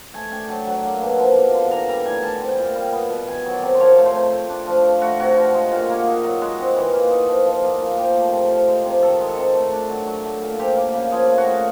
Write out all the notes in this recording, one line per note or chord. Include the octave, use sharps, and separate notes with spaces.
A3 G#5
D4 G5
F#3 A5
F#3
A#3
B2
F3
A#3
D3
E3 A#5
G3 A#5
A2 G#5
G3 A5
C4
G5
A#2
G3
B3
B2
D#3 G#5
F#3
D5
C3
C5
F3 C#5
A3
C5
C3
A3
D4
F3
F3
A3 F#4
C3 F#4
F3
G#3
A#2
A#3
D#4
F#3
G#3 F#4
C4
E3
A#3
D#4
F3
F3
A#3
A#2
F3 G4
A3
C3
F3
G#3
C3
D#3 A4
G#3
A4
C3
A3
D4
F#3
F#3
A3
A#2
F3 G4
A#3
C#3
F3 G#4
A3
F#4
A#2